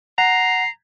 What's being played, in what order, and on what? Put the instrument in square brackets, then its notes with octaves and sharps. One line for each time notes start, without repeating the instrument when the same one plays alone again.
[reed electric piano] F#5 [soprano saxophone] A#5 [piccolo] C7